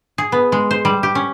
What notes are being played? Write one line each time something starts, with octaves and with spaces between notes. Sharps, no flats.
G#4
B3
G#3
C5
G3
G4
C#4